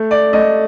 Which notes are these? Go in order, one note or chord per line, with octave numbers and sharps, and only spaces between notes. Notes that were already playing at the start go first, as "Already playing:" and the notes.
Already playing: A3
D5
A3 D#5